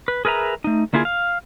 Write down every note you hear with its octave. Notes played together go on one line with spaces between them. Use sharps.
B4
G#4 A#4 B4 E5 A#5
A3 D#4
D3 A#3 E4 F4 G#4
F5